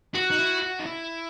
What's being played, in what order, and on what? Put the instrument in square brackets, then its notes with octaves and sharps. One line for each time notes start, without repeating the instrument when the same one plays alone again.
[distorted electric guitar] F#4
[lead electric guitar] D#4
E4
F#4
D#4
E4